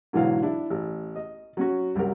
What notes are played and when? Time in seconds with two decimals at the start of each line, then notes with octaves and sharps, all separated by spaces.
0.13 G#2 B2 D3 E3 F#3 F5
0.43 D4 E4
0.70 A1
1.16 D#5
1.57 F#3 C#4 F#4
1.95 C2 F#2 G4 A#4